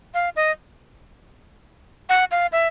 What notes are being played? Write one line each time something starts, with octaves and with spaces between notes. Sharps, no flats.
F5
D#5
F#5
F5
E5